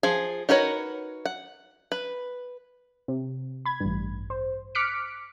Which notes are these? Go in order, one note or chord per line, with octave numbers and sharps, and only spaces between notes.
F3 G#4
D#4 F#4 A#4 B4 C#5
F#5
B4
C3
B5 G#6
A1 G2
C5
D6 F6 F#6 B6 C#7 D7